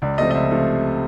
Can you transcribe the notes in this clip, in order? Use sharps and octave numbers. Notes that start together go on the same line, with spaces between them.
C#2 D5
C3 F3 A3 D#5
D#5
C#2 E5
C3 F3 A3